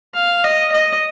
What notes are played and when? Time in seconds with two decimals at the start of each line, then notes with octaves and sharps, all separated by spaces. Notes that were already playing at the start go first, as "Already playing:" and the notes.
0.15 F5
0.44 D#5
0.72 D#5